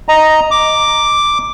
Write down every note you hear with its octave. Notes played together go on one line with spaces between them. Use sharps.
D#5 A#5
D6